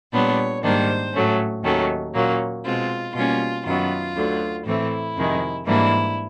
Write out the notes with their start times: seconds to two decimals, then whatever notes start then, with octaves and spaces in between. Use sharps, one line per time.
0.12 A#2 G3 B3 D4 C#5
0.63 G#2 D#3 G3 A#3 D4 C5
1.13 A2 F#3 A3 C#4
1.63 D#2 D#3 F#3 A3 C#4
2.14 A#2 F#3 A#3 C#4
2.64 B2 G#3 C4 F4
3.14 B2 G3 A#3 C#4 F4
3.64 F#2 D#3 F#3 B3 F4
4.15 D2 D3 F#3
4.65 A2 E3 A3 C4 E4
5.16 F2 C3 D#3 G#3
5.66 G#2 E3 G3 A#3 D4 E4